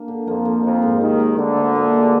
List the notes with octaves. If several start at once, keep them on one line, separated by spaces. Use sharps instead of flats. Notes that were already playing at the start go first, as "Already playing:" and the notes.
Already playing: A#3 D4
D3
F2 F3 A#3
A#3
F2 F3 A#3
G#2
D#2 D#3 A#3
A#3
D2 D3 D#4
D#4
A#2
G#3